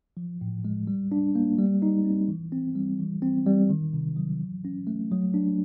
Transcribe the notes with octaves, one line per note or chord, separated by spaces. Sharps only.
F3
A2
G#3
G3
D4
A#3
G3
D#4
C4
E3
C4
G3
E3
C4
G3
D#3
C3
F#3
E3
C#4
A3
F#3
D4